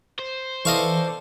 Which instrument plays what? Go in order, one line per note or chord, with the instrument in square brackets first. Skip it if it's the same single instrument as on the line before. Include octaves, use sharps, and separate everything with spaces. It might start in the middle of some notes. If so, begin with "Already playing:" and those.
[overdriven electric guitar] C5
[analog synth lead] E3 [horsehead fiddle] A4 D5 [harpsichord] D#5 F5 C#6